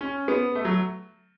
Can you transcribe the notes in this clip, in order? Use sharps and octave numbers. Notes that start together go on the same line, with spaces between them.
C#4
B3
A3
F#3